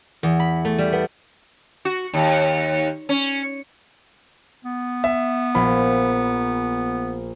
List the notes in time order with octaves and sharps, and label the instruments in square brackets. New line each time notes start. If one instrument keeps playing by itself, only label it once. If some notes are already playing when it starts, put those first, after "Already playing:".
[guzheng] E2
B5
A3
G3
B3
[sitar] F#4
D#2
C#4
[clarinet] B3
[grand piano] E5
[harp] A#1 [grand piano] B5